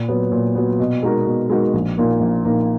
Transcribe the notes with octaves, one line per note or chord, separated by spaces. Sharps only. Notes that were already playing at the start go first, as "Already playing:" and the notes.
Already playing: A#2
F#3 B3
A#2
F#3 B3
B2
G#3 D#4 F#4 A#4
B2
G#3 D#4 F#4 A#4
A#1
A#2 A#3 D#4 A#4
A#1
A#2 A#3 D#4 A#4